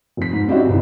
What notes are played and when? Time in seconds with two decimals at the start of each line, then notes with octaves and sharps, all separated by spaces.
0.17 F1 B6
0.33 G#2
0.48 G3 C4 C#4 D#4 E4 F#4
0.66 G1 C2